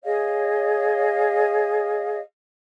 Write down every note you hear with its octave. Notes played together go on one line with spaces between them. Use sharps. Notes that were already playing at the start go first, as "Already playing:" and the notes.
G#4 C#5 D#5 F5